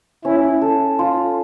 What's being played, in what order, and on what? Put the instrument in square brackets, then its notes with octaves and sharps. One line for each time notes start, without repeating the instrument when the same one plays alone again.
[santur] C#4 [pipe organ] E4
[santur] A4
F4